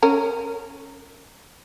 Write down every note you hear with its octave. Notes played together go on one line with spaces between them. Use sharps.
C#4 A#4